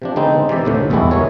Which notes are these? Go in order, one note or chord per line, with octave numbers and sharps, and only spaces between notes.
C3 F3 D4
D3 G#3 B3 C4 D#4
C3 E3 D5 E5
D#2 A2 D3
B1 E2 G3 G#3 E4 F#4
E3 B3 A#4 C#5